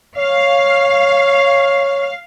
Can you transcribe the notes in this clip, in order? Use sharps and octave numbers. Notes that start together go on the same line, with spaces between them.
C#5 F5